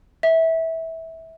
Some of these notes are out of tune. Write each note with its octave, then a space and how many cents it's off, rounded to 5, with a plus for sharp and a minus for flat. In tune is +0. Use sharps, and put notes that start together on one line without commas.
E5 -20